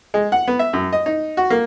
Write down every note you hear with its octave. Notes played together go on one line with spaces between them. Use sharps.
G#3
F#5
B3
E5
F#2
D#5
D#4
F#4
A#3